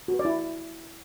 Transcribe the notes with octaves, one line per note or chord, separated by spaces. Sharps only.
F#4
B4
D5
E4